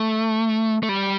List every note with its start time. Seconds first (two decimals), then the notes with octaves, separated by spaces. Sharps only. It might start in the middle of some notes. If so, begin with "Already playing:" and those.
Already playing: A3
0.83 A3
0.89 G3